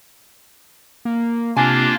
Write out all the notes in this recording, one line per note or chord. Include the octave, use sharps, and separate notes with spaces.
A#3
C3 A#3 D4 F4 G#5